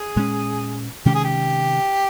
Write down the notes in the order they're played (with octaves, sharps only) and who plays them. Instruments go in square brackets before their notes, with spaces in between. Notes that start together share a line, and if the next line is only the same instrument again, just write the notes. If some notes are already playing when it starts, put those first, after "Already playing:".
Already playing: [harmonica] G#4
[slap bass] A#2 G#3 C#4
[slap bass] C3 D#3 G#3 C#4 [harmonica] G4
[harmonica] G#4
G4